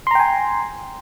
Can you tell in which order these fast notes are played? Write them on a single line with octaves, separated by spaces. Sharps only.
C6 A#5 G5 G#5